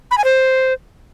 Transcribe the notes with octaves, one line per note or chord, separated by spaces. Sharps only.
B5
G#5
C5